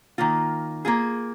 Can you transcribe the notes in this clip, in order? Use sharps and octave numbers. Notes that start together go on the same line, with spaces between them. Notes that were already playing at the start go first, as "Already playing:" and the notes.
D#3 A#3 F4
A#3 F4 G#4